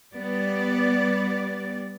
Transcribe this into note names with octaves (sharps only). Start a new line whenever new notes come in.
G3 B3 D5